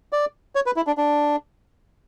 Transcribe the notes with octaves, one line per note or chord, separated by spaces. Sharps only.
D5
C#5
B4
E4
D4
D4